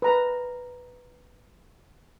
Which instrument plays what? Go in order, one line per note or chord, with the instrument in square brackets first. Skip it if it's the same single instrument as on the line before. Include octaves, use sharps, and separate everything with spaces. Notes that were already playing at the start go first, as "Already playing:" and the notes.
[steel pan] B4 A#5